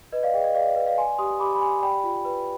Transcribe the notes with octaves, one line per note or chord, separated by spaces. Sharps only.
B4 D#5
D5 F5
G#4 D#5 G5
D#5
G#4 D5 F5
D5
B4
D5 F5
D5 G#5 C6
G4 C6 D#6
G4 B5 D6
B5
G4 G#5 C6
D5 G5 B5
F4
B4